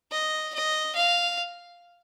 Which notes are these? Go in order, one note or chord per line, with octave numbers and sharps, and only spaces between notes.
D#5
D#5
F5